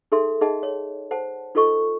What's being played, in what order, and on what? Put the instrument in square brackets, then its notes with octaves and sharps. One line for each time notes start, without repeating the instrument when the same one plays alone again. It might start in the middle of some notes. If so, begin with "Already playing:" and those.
[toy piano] D#4 G#4 A4 E5 C6
D#4 G#4 D#5 F#5 A5
C#5
C5 F#5 A5
D#4 F4 A4 D#5 C#6